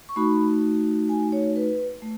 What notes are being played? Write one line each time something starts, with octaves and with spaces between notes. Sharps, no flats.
C#6
A3 D#4 F#4 B5
G#5
C#5
B4
A3